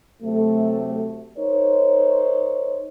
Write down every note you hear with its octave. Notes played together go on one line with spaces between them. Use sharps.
C3 F#3 A3
D#4 A#4 C5 C#5